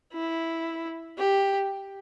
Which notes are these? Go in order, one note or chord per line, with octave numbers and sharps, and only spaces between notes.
E4
G4